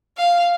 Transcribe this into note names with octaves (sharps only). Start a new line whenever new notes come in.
F5